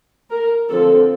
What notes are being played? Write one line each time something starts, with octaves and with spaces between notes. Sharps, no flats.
A#4
D3 F3 C4 A4